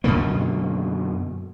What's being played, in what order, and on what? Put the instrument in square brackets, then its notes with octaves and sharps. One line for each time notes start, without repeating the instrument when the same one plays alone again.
[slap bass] F#2 B2 D3 A#3